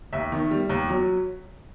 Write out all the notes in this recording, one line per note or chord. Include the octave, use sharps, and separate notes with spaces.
D#2 E5
D#3
G3
D#2
F#3